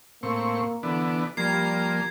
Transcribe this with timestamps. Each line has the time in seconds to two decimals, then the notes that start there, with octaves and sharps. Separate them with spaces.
0.23 A2 A#3 C4 C#6
0.83 D3 E3 B3 D4
1.37 F3 G3 A#3 G#6 C7